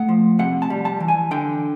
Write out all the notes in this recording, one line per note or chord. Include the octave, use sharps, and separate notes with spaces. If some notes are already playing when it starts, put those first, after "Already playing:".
Already playing: A3 F#5
F3
C3 F#5
A5
G3
A5
E3
G#5
D3 G5